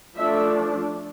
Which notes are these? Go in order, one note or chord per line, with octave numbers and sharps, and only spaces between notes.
F3 A3 D4 E5